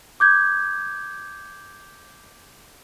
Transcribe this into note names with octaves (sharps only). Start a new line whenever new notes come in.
D6 G6 G#6